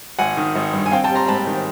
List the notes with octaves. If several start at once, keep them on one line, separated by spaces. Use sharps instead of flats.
G#1 F#5 G#5
D#3
G#1
G2
G#5
C4 F5 G5
G5 A5
G3
A#5 C6
G#2 A5 B5
D#3